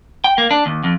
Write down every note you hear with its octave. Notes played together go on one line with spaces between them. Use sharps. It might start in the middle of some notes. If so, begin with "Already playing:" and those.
G5
A#3
D4
D#2
F2